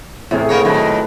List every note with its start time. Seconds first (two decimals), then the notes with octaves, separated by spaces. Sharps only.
0.31 E2 A2 C3 G#4
0.49 A#3 A#4 C#5
0.65 A#2 D#3 F#3 D#4 B4 A5